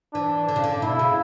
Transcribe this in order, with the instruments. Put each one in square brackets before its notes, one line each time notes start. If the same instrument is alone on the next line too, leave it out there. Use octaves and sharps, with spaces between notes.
[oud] E3 [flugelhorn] D4
[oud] D3
C#3
D3
[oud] B2 [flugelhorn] E4
[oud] C#3